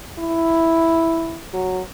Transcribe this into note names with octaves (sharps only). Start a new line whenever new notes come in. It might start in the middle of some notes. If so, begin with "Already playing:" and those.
E4
F#3